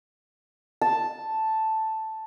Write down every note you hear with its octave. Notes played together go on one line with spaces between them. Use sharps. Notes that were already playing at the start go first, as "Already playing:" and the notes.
A5